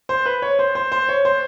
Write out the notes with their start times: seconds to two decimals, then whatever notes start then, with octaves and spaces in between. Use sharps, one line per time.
0.09 C5
0.26 B4
0.42 C#5
0.59 C5
0.75 C5
0.92 C5
1.09 C#5
1.25 C5